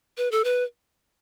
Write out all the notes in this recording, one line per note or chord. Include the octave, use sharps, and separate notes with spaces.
B4
A4
B4